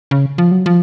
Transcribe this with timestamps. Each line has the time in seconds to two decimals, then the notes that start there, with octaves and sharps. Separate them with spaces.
0.11 C#3
0.38 F3
0.51 F#3
0.66 F3